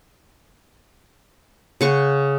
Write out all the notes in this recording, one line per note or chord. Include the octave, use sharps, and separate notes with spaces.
C#3 F#5 C#6